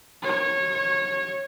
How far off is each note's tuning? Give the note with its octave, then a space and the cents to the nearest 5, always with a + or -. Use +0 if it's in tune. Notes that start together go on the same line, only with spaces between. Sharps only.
C#5 -20